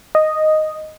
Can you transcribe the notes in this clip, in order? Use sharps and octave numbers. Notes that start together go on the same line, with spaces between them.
D#5